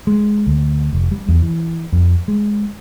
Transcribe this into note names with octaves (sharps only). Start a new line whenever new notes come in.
G#3
D2
F1
G3
E2
E3
F2
G#3